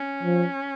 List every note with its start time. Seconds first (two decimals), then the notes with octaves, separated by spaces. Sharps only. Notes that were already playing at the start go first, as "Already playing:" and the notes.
Already playing: C#4
0.23 F3